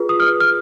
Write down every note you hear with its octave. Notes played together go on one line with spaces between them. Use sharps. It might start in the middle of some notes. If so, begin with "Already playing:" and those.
Already playing: F4 G#4 B4
D#6
F6
F6